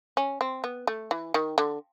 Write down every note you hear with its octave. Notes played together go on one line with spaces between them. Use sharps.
C#4
C4
B3
A3
E3
D#3
D3